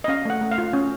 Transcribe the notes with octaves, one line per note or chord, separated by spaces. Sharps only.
D#5
C#4 F5
A3 F#5
A3
F5
F4
C#4